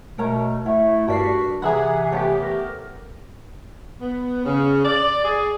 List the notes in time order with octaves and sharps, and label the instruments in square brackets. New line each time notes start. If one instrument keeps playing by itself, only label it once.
[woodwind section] B2 A3 [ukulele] A#4 C#5 A#5
[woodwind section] A3 E4 [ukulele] C#5 E5 F#5
[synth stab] G2 B6 C7 [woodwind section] F#4 [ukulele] A4 A#4 D5
[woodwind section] C3 E3 [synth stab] G#4 E5 F#5 [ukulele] A#5 B5
[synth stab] A3 B3 G4 [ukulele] C#5 G5
[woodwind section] A#4
[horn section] B3
C#3
D5
G#4